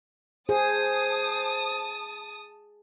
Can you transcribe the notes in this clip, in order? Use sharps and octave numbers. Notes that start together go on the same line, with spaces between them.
G#4 C5 A5 D#6